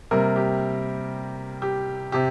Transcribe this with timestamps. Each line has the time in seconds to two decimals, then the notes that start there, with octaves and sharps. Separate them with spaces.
0.11 C3 G3 A#3 A#4
0.36 G4
1.62 G4
2.12 C3 G4